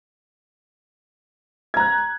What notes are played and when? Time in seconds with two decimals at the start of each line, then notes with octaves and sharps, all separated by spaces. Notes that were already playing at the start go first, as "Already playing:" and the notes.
1.74 G#6
1.77 A#5
1.80 F#6